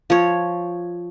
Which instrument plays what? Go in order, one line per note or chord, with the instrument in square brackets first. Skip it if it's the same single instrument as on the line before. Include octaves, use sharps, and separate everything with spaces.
[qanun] F3 C#5